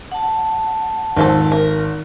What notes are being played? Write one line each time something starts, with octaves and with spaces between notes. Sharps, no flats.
F#5 A5
G#1 D#3 F3 A4
A#4